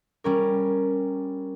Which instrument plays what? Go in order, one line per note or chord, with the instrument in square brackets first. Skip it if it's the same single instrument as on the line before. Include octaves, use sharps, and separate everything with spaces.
[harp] G3 C#4 A#4